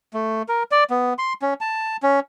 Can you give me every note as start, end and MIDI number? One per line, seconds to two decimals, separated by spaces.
0.13 0.42 57
0.49 0.63 70
0.71 0.84 74
0.90 1.14 59
1.18 1.33 84
1.42 1.54 61
1.61 1.97 81
2.03 2.20 61